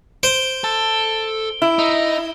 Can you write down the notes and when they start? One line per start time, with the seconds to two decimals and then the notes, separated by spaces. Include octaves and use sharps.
0.23 C5 D7 G7
0.64 A4
1.62 E4
1.79 D#4